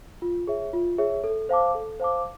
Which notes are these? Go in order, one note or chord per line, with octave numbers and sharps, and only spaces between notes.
F4
G#4 C#5 E5
F4
G#4 C#5 E5
A4
C5 F5 A5 D6
A4
C5 F5 A5 D6